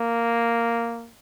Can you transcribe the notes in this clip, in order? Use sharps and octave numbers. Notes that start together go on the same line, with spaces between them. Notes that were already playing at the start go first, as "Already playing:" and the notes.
Already playing: A#3